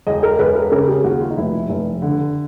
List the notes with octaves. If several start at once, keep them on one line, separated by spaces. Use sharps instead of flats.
E1 D#5
A#4
E1 B4
A#4
C#3 A#4
G4
D#2 F#4
F4
D#4
F1 E4
F1
D3